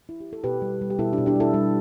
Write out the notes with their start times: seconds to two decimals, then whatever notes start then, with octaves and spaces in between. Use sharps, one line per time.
0.09 E4
0.20 G4
0.33 A4
0.44 B2 G4 B4
0.62 G3
0.81 G3
0.90 G4
0.99 B2 E4 A4
1.13 D4 G4
1.18 B2
1.26 D4 G4
1.36 G3 E4 A4
1.54 G3